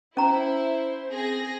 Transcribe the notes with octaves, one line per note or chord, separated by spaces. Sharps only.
C#4 E4 C5 A#5
C4 G#4 A#6